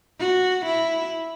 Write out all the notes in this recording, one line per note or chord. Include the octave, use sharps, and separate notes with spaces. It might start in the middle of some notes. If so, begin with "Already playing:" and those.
F#4
E4